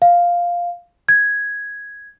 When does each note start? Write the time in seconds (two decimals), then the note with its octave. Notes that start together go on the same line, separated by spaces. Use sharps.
0.02 F5
1.09 G#6